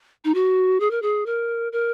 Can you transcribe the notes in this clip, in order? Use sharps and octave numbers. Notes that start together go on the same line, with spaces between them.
D#4
F#4
G#4
A#4
G#4
A#4
A#4